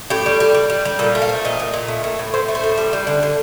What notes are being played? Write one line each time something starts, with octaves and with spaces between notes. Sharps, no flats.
A2 G4
G3
G3
G3
G3
G3
A#2 A4
A3
F5
F3
A#2 D#5
A#2
A#2
A3
A2
A2
A2 C5
A3
C5
A2
G3
G3
D3
D3